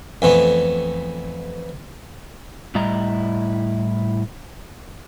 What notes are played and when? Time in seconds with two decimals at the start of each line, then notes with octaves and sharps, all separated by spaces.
0.22 F2 E3 A3 B3
2.75 A2 G3 E4 D#5 A#5